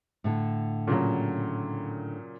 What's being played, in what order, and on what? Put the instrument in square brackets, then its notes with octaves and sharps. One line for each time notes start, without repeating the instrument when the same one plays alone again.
[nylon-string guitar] A2 D3
[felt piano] A#2 C#3 F#3